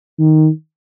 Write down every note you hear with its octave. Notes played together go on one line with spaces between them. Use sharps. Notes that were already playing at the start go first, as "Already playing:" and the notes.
D#3